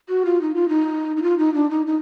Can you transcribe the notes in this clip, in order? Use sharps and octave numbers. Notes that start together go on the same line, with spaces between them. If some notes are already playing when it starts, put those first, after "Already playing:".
F#4
F4
D#4
F4
D#4
D#4
F4
D#4
D4
D#4
D#4